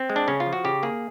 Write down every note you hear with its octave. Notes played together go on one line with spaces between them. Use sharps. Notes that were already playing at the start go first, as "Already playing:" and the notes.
Already playing: C4
G#3
D4
C#3 C#4
F4
F3
F#4
C#3 G4
A#3 G#4